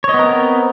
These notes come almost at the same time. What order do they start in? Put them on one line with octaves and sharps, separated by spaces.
C#5 D#5 B3 A#4 C4